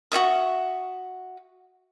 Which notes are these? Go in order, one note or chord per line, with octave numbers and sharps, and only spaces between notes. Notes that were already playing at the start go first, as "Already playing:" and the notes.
F#4 C#5 E5 D#6